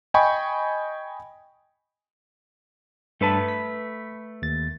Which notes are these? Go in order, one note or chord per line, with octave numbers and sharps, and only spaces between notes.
D#5 G5 G#5 B5 C#6
G2 A3 A4 B4 A5
B6
D#2 A6